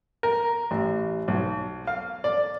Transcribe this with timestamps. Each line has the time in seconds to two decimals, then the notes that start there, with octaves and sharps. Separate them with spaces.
0.23 A#4
0.71 A1
1.28 B1
1.87 F5
2.24 D5